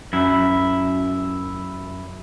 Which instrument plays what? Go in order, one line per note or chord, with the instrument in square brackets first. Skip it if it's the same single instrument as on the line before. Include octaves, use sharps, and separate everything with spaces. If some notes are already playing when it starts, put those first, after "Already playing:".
[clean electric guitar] F#2 E4